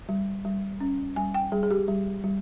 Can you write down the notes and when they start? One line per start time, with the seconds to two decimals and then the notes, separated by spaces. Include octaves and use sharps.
0.09 G3
0.45 G3
0.80 C#4
1.16 G3 G#5
1.34 G5
1.52 G3 G#4
1.63 G#4
1.71 G4
1.88 G3
2.24 G3